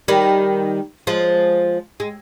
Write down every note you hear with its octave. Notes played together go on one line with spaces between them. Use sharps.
D#3 G3
F3 G#3
G#3